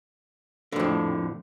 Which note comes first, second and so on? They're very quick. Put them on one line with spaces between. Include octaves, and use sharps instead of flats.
D3 F2 A2